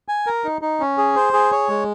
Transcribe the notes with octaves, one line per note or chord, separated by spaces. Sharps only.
G#5
A#4
D#4
D#4
C#4
G#4
C5
G#4
C#5
G#3